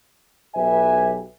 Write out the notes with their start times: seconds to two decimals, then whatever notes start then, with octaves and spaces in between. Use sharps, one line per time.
0.55 B1 F#3 G4 B4 E5 G#5